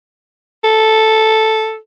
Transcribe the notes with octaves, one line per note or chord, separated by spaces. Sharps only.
A4